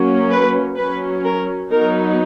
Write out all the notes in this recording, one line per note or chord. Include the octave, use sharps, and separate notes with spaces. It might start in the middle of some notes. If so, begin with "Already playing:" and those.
Already playing: F#3 A#3 C#4
B4
F#3 C#4 B4
A#4
F#3 B3 D#4 A#4